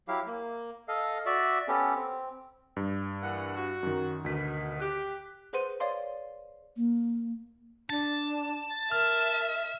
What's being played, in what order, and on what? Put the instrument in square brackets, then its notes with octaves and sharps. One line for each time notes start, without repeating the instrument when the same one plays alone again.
[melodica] F#3 E4 G4 F5
A#3
A4 D#5 F5
F#4 D5 E5
B3 C#4 G4 A4
C4
[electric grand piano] G2
[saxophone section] E3 A#3 F#5
F#4
[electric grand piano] F#2 D#3
[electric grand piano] D2 B6 [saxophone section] B2 D#3
[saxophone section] G4 [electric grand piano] F#6
[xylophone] G#4 B4 C5 F#5 C6 D#7
C#5 D5 F5 C6
[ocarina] A#3
[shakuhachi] D4 [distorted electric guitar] A5
[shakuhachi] A#4 [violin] E5 [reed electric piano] F6